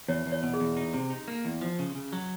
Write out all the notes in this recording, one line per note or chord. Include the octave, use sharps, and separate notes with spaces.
E2 C#5
E2
C#5
B2
G#4
E2
D#4
C3
D#4
A#3
E2
F3
C#3
C#3
F#3